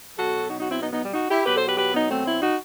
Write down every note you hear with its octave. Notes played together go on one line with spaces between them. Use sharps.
B2 F#3 F#4 A4
D#4 F#4
D#4 F#4
C4 E4
B3 D#4
B3 D#4
G3
D#4 F#4
E4 G4
B2 F#3 G4 B4
A4 C5
G4 B4
G4 B4
B3 D#4
A3 C4
C4 E4
D#4 F#4